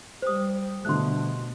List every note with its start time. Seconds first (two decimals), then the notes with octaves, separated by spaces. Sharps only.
0.22 G3 C5 D#6
0.85 B2 D3 G3 A3 C6 F#6